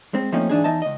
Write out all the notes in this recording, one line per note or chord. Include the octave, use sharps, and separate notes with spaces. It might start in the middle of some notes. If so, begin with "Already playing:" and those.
G#3 C4
F3 A3 A#3 C4 C#4 D#4
G#2 E3 D4 D#4 G#4
E2 E3 D#4 D#5 E5 A5
C#2 D#5